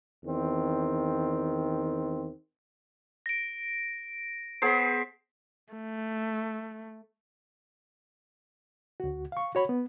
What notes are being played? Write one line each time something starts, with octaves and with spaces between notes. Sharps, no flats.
E2 D#3 C4
A#6 D7
B3 G#4 C5 B6 C7
A3
D2 F#4
F5 C#6
F#4 C#5 B5
B3